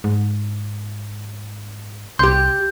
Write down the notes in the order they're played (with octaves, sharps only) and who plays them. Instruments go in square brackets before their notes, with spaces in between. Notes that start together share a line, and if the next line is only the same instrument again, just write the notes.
[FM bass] G#2
[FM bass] C2 [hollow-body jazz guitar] G4 C6 [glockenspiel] G6